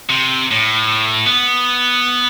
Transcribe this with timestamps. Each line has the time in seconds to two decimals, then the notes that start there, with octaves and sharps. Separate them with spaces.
0.10 C3
0.51 A2
1.26 B3